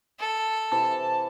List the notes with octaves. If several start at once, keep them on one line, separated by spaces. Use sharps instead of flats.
A4
C3 E3 A5